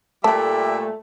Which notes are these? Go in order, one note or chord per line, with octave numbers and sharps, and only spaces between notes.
A#2 G3 A3 E5 A5